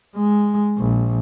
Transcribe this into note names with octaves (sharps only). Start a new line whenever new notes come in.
G#3
A#1